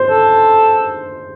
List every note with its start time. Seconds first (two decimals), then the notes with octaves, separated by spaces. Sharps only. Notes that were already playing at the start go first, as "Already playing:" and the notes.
Already playing: C5
0.10 A4